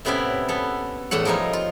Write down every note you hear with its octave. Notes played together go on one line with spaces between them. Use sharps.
A2 C3 B3 C#4 E4 D5
B3 A4
E2 A2 A3 F#5
F3 G3 D#4 A#4 C#5
F4